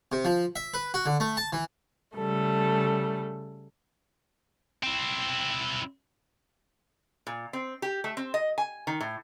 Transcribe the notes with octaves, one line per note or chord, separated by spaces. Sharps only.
C3
F3
E5
B4
F#4
D3
A3
A5
E3
C#3 G3 A3 A4
C4 E4
A#2
C4
G4
A3
C4
D#5
G#5
D#3
A2